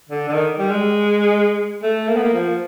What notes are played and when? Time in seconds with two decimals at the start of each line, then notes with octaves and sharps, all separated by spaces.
0.09 D3
0.29 D3
0.33 D#3
0.59 G3
0.71 G#3
1.83 A3
2.08 A#3
2.16 B3
2.24 A#3
2.33 F3